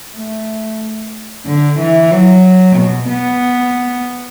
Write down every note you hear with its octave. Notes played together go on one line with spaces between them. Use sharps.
A3
D3
E3
F#3
B2
B3